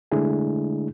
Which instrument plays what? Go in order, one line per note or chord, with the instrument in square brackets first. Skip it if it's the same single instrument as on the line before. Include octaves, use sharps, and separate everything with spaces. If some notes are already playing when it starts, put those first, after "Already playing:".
[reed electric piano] D3 G#3 A3 D4 E4 G#4